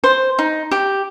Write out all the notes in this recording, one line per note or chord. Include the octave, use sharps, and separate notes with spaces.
C5
D#4
G4